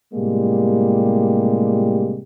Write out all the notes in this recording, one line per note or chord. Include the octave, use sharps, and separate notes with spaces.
A2 C3 G3 G#3 A#3 G4